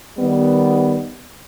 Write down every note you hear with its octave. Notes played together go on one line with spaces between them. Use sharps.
D#3 G3 B3